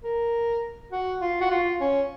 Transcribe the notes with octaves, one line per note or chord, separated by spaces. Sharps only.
A#4
F#4
F4
F#4
F4
C#4